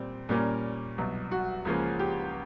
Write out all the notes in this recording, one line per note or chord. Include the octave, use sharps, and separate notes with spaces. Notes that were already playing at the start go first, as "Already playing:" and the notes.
Already playing: A#2 G3 C4
A#2 G3 A#3 C#4
C2 B2 F#3
F#4
C#2 C#3 F3 A#3 C#4
G4